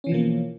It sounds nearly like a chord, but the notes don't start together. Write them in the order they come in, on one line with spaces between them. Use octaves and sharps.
C#4 E3 F3 B2 A#3